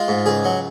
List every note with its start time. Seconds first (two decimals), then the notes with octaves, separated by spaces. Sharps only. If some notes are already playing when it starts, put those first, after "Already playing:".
Already playing: G#3 F4
0.08 G#2
0.26 C#2 G#4
0.45 F#3